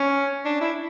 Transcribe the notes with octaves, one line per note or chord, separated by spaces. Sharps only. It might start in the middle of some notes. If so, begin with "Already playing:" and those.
Already playing: C#4
D4
E4